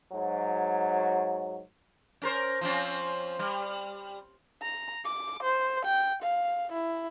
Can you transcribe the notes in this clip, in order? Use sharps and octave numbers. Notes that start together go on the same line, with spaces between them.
G#2 F#3
C#4 A#4 C5
F3 C4 C#4
G3
A#5
D6
C5
G5
F5
E4